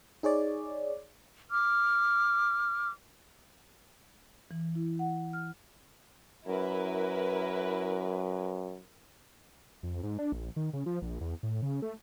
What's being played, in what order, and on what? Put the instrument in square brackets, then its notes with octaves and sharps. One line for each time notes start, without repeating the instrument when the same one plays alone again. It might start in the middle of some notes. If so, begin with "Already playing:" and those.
[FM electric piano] D#4 G#4 C#5 D5
[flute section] D6 F6
[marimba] E3
E4
F#5
F6
[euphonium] F#2 [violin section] E4 A#4 B4
[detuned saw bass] F2
G#2
D4
A#1
D#3
C#3
F3
A#1
E2
A2
C#3
A3